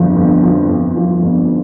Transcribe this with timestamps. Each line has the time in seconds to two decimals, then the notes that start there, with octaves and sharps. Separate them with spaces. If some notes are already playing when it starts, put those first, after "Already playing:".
Already playing: G1 F2 F3
0.16 G1
0.43 F2 F3
0.69 G1
0.96 F2 F3
1.22 G1